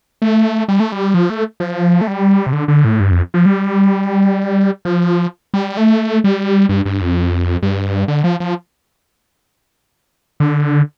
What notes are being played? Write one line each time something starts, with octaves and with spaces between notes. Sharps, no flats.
A3
G3
A3
G3
F3
A3
F3
A3
G3
C3
D3
D3
A2
G2
F2
F3
G3
F3
G3
A3
G3
G2
G2
F2
G2
D3
F3
F3
D3